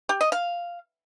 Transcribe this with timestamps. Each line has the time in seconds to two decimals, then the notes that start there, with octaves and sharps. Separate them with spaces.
0.09 G4
0.21 D#5
0.32 F5